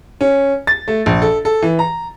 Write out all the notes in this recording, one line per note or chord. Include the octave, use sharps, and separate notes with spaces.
C#4
A6
A3
A#1
A4
A4
E3
A#5